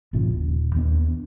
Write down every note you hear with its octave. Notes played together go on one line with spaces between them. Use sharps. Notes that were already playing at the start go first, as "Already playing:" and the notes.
G1 A#2 C#3 F3
D#1
D#2 B3 D4